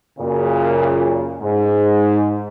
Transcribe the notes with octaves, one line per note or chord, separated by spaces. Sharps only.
F#2 A#2 C#3
G#2